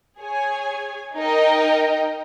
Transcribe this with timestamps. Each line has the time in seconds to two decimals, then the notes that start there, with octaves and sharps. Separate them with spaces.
0.18 G#4 C#5 G#5
1.16 D#4 A#4 D#5 G5